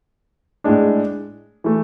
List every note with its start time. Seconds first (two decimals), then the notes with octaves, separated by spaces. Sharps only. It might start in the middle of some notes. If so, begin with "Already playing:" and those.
0.64 A2 G#3 D4
1.64 E3 A3